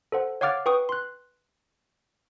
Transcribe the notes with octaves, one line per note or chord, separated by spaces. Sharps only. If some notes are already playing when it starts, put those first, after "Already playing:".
A4 C5 F#5
C#5 F5 F#5 D6 F6 A6
B4 G5 C#6 D#6
C6 F#6